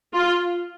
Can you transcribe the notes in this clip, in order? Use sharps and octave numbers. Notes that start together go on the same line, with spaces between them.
F4